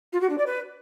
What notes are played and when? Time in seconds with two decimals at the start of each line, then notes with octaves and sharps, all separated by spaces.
0.13 F4
0.21 F#4
0.30 D4
0.38 D5
0.46 B4